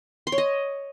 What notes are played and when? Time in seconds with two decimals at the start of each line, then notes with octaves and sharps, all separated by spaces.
0.27 C6
0.32 C#5
0.38 D#5